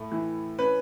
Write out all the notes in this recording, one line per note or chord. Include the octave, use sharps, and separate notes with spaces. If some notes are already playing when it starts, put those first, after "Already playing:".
Already playing: A2 A3
E3
C#4 B4